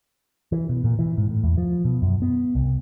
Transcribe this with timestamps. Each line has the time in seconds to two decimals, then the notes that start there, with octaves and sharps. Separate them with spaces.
0.52 E3
0.69 B2
0.84 A#2
0.99 E3
1.18 G#2
1.29 A2
1.43 E2
1.58 F3
1.85 B2
2.02 F#2
2.22 B3
2.55 C2